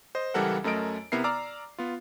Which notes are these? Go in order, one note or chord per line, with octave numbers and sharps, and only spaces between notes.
C5 D#5
C#2 E3 G3 A4 A#4 F#5
F#2 A3 A#4 D#5 D7
C3 B3 E4 A#4 C7
D5 A#5 D6 E6 F6
B3 F4